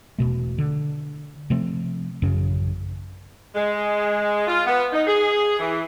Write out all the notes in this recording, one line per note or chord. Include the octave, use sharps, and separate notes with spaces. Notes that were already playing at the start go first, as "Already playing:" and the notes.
E1 C#2 B2 A3
D3
C3 F3 A3 C4
A1 F#2 C#3
G#3
F4
B3
D#4
G#4
E3